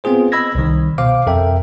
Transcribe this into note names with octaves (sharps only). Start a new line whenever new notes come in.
B3 C4 F4 G#4 C5
D#5 B5 E6 G#6 A#6
C2 D#3
B2 C5 F5 D6
F2 A4 A#4 E5 G5